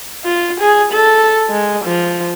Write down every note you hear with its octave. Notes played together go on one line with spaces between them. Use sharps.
F4
G#4
A4
G#3
F3